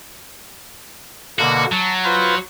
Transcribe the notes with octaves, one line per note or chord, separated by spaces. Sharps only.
B2 D3 A#3 F#4
F#3 A5
F4 B4 C5